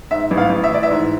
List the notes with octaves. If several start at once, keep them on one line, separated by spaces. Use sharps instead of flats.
G#2 E5
A1
F5
A1
E5
E3 D5
E5
G#2